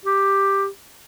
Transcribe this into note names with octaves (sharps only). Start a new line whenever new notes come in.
G4